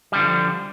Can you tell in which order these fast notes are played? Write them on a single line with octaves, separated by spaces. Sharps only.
G3 D3 F3